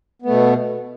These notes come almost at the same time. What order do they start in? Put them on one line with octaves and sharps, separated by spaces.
B3 A3 B2